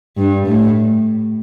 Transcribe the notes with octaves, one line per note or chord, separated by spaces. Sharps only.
G2
A2